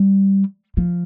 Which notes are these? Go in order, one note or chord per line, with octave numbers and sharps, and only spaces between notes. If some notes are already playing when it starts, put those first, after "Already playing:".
Already playing: G3
F3